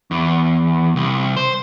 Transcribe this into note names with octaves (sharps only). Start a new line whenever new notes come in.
E2
C2
C5